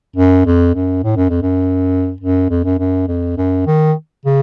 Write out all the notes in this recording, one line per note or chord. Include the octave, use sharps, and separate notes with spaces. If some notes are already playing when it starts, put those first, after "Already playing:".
F#2
F2
F#2
A2
F#2
F2
F#2
F#2
F2
F#2
F#2
F2
F#2
D#3
C#3